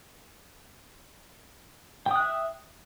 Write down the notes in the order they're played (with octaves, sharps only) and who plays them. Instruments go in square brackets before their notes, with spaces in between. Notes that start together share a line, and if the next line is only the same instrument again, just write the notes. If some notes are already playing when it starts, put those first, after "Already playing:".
[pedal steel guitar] G5
D#6
F#6
E5